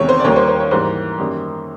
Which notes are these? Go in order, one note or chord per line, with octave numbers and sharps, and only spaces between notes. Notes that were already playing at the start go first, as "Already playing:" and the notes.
Already playing: E2 C3 D#3 G#3 C#5
C5
D5
D#2 D#3 G3 A#3 C#5
C5
C5
C#5
G#2 E3 G3 A#3 C5
F#2 D#3 G3 A#3